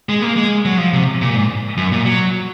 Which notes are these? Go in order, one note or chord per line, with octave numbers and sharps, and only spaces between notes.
G#3
A#3
G#3
F#3
F3
C3
A#2
G#2
F#2
A#2
F#3